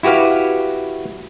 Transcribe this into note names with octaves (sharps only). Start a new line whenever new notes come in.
E4 F#4 G4 B4 F5